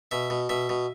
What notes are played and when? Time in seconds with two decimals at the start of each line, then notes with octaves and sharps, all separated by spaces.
0.11 B2 E5
0.30 B2
0.49 B2 E5
0.69 B2